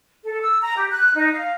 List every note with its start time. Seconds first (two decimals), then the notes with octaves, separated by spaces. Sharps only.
0.24 A4
0.41 E6
0.62 A#5
0.78 G4
0.90 F#6
1.15 D#4
1.34 F5